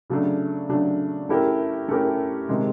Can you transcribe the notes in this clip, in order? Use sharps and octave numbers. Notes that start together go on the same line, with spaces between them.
C#3 F#3 A3 D4
C#3 F#3 A3 D4
A3 C#4 E4 G4 A#4
A3 C#4 E4 G4 A#4
C3 D#3 G#3